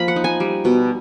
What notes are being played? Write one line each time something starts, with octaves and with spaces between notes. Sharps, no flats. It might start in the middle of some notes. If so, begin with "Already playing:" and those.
Already playing: F3 A#3 B5
F#5
D#4
G#5
G3
B2